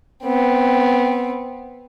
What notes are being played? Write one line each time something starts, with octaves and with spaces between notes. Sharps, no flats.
B3 C4